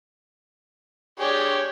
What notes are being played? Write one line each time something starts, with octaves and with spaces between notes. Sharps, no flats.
D4 G4 G#4 C#5